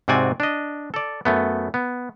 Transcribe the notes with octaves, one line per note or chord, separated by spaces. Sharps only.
G#2 C3 C4 F#4 D5 G#5
D4 D#5
A4 D5
F#2 A3 B3
B3